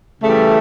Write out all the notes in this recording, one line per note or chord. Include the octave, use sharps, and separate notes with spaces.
C#3 E3 G3 A3